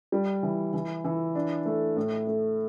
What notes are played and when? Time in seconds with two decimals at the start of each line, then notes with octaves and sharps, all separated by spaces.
0.12 G3
0.43 E3
0.73 E3
1.04 E3
1.35 D4
1.66 A3
1.97 A2
2.27 A3